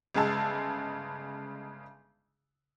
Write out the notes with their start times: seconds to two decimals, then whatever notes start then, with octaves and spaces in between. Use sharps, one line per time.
0.15 G1 C#3 G#3 G#4 A5 E6